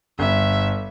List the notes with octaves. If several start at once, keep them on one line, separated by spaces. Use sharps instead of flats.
G1 E5